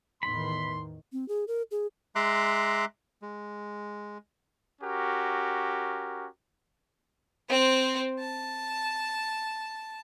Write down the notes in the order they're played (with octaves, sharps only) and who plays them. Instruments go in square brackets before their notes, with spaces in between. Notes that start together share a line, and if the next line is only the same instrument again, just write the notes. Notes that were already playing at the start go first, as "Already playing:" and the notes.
[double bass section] E2 A2 D#3 [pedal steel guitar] B5 [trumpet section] C6
[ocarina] C4
G#4
A#4
G#4
[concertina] G#3 E5 A#5 C6 D6 F#6
G#3
[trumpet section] C#4 F#4 G4 A#4
[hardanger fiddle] C4 C5
A5